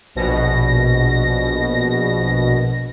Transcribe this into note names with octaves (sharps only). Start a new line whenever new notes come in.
A#1 B2 A#6